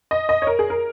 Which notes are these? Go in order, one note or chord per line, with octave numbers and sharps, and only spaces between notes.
D#5
D#5
C#5
A#4
G#4
A#4